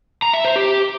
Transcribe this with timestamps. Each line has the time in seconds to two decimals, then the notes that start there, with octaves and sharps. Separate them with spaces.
0.22 A#5
0.34 E5
0.45 C5
0.56 G4